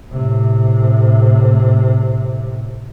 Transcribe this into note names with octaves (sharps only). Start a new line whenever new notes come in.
A2 C3